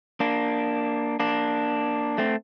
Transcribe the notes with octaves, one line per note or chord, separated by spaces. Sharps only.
A#3 D4
A#3 D4
A3 C4